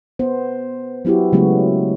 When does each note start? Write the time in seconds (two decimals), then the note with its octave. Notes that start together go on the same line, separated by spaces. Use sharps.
0.19 B3 C5
1.05 F#3 B3 E4 F#4 G4
1.32 C#3 F#3 G#3 A3 B3 F#4